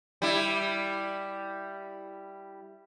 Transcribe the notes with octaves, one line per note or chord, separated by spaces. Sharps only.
G3 E4